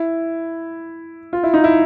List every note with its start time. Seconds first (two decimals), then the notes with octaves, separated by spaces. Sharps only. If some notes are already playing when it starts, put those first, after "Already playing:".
Already playing: E4
1.33 F4
1.43 E4
1.54 D#4
1.64 E4